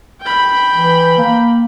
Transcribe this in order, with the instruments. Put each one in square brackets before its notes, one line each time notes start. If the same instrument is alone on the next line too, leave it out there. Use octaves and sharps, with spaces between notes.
[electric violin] G5 B5
[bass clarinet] E3
A#3